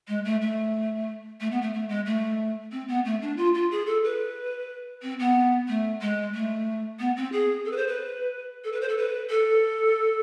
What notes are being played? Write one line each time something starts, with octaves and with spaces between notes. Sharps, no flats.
G#3
A3
A3
A3
B3
A3
A3
G#3
A3
C4
B3
A3
D4
F4
F4
G#4
A4
B4
C4
B3
A3
G#3
A3
B3
C4
G#4
A4
B4
C5
B4
A4
B4
C5
A4
B4
A4